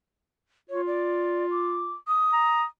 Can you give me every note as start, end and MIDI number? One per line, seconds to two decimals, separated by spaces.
0.70 1.94 65
0.70 0.81 73
0.87 1.46 74
1.51 1.93 86
2.08 2.63 87
2.33 2.63 82